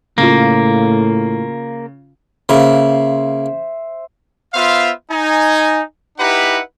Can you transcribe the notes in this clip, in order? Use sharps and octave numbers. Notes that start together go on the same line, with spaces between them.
A2 C#3 A#3 F4
C#3 A#3 C5 E5
B3 F4 C5 E5 F5
D#4 G#5
D#4 E4 G4 B4 F#5 A#5